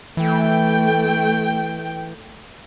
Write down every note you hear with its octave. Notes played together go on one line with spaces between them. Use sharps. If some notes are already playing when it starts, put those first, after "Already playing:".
E3 A3 G5